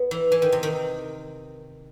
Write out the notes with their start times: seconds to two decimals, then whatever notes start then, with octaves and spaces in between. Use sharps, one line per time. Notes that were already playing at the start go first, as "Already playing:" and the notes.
Already playing: B3
0.11 E3
0.32 E3
0.42 D#3
0.52 C3
0.63 D#3